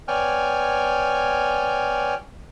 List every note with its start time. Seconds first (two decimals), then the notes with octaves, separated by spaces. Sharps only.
0.08 B3 C#5 D5 G5 G#5 F6